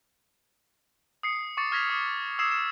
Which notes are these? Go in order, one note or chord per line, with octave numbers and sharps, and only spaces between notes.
D#6 C7 C#7
C#6 D6 A6 C#7
C#6 F6 G#6 A#6 B6 F7
D#6
D#6 E6 G#6 C7 E7
E7